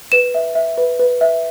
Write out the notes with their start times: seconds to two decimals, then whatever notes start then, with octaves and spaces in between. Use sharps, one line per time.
0.12 B4 E7
0.35 E5
0.55 E5
0.78 B4
0.99 B4
1.21 E5